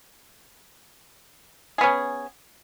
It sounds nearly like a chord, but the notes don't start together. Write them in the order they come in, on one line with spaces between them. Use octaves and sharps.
G#4 B3 C#4